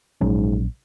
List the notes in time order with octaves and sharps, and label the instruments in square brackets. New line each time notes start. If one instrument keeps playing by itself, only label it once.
[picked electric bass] A#1 F#3 C#4 [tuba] G#2